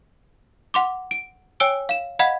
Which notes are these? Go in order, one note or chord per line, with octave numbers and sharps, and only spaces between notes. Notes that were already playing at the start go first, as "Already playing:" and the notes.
F#5 C6 D6
D7
C#5 G5 G#5 E6 D7 G7
F5 E7
D#5 F5 F#5 B5 G#6 B6